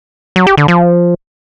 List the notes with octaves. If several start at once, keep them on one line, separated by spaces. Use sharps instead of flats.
F#3
G4
D3
F3